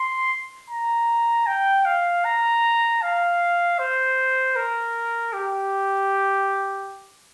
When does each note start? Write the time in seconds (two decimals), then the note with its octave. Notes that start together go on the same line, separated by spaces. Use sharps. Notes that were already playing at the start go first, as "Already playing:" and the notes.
Already playing: C6
0.70 A#5
1.47 G5
1.85 F5
2.25 A#5
3.02 F5
3.79 C5
4.56 A#4
5.33 G4